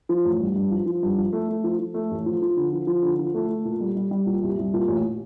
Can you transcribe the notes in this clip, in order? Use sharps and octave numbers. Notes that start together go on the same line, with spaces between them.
F3
A1
G2
G2
F3
F3
G2
F3
A3
A3
F3
F3
A3
A1
F3
F3
D3
F3
F3
D3
F3
A3
A3
A#2
G3
G3
G3
A#2
C2
C2
A#2
A1